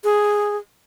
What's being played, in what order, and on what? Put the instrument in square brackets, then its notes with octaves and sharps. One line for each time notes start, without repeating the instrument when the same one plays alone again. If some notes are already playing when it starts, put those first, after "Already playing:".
[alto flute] G#4